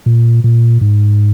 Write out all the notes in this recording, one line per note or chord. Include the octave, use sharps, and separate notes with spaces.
A#2
A#2
G#2